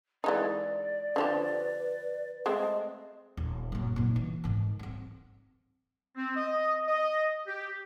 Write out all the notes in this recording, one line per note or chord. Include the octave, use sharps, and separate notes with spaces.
E3 G#3 D#4 D5
D3 F3 G4 B4
G#3 A3 C4 D#5
D#1
F#2 A#2
A#2 D#4
E3
G#2 D#3
B3 C4
C4
D#5
D#5
G4